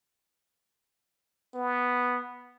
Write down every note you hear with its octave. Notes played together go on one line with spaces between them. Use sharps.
B3